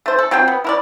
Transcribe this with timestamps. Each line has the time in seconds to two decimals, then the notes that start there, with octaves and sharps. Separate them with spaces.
0.06 A3 C5
0.19 A4
0.31 F#3 C4 F4 G5
0.48 B3
0.64 E4 A#4 D5